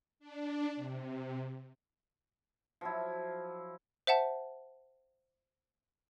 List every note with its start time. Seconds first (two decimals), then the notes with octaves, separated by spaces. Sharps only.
0.20 D4
0.76 C3
2.81 F3 F#3 E4
4.07 C5 E5 F#5 A5